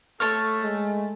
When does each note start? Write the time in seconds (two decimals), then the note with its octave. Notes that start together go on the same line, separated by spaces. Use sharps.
0.20 A3 A4 C#5 C#6 F6
0.63 G#3